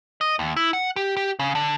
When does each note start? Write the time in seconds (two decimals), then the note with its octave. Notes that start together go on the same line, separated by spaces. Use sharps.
0.21 D#5
0.39 D#2
0.56 E4
0.73 F#5
0.96 G4
1.17 G4
1.39 C#3
1.55 D3